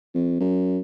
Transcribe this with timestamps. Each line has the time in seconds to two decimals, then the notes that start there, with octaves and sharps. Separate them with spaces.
0.15 F2
0.40 F#2